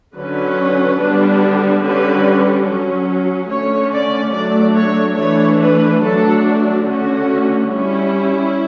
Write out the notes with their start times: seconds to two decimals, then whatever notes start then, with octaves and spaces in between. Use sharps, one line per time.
0.14 D3 F#3 C#4 B4
0.99 D3 G3 B3 D4
1.82 D3 G3 C#4 B4
2.66 F#3 C#4
3.49 D3 A3 C#4 C#5
3.92 D5
4.33 F#3 A3 D4 D5
4.76 C#5
5.17 E3 A3 D4 C#5
5.59 B4
6.01 F#3 A3 D4 A4
6.85 D3 A3 C#4 F#4
7.69 G3 C#4 E4